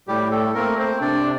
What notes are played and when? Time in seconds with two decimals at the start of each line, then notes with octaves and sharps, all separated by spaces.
0.08 A2 G3 G4
0.31 A3 A4
0.55 A3 A#3 C4 A#4
0.77 C4 C5
1.00 C3 D4 D5